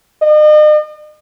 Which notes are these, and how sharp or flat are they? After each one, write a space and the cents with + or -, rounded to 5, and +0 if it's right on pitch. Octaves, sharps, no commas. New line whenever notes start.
D#5 -40